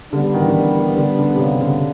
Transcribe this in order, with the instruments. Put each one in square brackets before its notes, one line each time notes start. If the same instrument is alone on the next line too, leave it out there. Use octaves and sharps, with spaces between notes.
[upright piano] D3 [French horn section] G3 B3 D4
[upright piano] D#3
E3
D#3
D3
D3
C3
C#3
D3